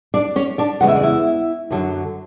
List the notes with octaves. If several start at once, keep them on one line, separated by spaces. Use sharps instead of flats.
D4 D5
C#4 C#5
D4 D5
E2 C#3 G#3 F#5
E5
D5
E4 E5
F#2 D3 F#3